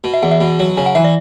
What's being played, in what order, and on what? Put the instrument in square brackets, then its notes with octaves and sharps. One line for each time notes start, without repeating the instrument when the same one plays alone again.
[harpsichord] B2
[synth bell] E5
[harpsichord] E2 [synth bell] F#5
[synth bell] E5
[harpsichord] B2
F#3
[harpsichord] C#3 [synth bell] G#5
[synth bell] F#5
[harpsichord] E3 [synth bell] E5
[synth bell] D5